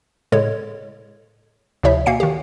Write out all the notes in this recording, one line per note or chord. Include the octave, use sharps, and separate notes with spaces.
A2 C#3 G#3 A4 C#5
D2 C3 F3 E4 C#5 E5
B2 A#3 F5 G#5 C7 C#7
D#3 G4